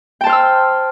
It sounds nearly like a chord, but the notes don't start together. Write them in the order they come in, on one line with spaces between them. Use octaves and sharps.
G5 A5 C5 F6 E6